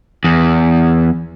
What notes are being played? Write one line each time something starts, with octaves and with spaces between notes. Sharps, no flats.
E2